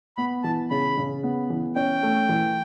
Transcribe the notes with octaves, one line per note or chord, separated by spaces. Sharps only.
B3 B5
E3 A5
C#3 B5
C#3
B3
E3
C#4 G5
A3
E3